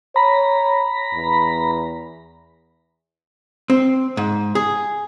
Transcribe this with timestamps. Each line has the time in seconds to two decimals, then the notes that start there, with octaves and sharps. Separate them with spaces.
0.16 C#5 A#5 B5
1.13 E2
3.70 C4
4.17 G#2
4.55 G#4